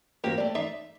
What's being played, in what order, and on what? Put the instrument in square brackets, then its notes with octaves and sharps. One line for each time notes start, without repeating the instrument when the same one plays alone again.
[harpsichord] A#2 F#3 C4 [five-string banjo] A#3 G4
[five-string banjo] A3 D5
[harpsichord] D#4 D5 C6 [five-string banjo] E5